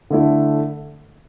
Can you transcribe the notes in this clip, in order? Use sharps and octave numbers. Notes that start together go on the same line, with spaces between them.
D3 A3 E4